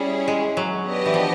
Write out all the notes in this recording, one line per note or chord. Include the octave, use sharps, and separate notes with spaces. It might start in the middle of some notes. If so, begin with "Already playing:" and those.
Already playing: G3 C#4 E4 G#4 C#5
G#3
F#3
B3 D4 G4 B4 D#5
E3
F3